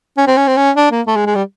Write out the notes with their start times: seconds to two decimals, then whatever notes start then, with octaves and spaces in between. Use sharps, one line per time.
0.17 C#4
0.27 C4
0.37 C#4
0.47 C4
0.57 C#4
0.76 D4
0.91 A#3
1.07 A3
1.16 G#3
1.26 G#3
1.35 G3